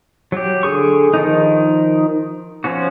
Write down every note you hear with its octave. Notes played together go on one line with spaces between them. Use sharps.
F#3 G4
D3 G#4 C#6
D#3 F3 D#4
F3 C#4 F#4